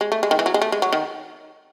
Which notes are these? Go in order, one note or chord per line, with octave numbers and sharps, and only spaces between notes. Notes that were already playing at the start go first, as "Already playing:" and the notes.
G#3
A3
G#3
D#3
E3
F#3
G#3
A3
G#3
F#3
D#3